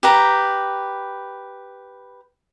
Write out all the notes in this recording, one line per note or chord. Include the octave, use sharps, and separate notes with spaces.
G4 B4 A#5